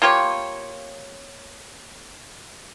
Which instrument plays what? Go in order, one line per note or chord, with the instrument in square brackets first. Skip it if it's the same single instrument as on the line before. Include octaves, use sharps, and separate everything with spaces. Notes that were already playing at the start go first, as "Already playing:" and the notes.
[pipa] A#3 F4 G4 C#5